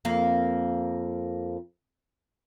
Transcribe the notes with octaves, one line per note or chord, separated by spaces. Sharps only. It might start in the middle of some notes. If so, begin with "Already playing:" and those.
F2 A#3